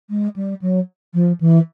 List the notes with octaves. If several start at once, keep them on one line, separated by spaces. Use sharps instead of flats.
G#3
G3
F#3
F3
E3